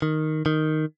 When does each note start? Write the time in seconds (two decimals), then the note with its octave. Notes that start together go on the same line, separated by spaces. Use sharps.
0.02 D#3
0.46 D#3